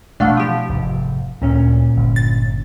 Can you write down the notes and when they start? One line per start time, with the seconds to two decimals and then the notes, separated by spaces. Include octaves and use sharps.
0.20 B2 D3 E3 A3 D4 D5 F5 F#5
0.37 F3 G4
0.69 F1 G#2
1.42 D2 A#2 C#4
1.97 G1
2.16 A6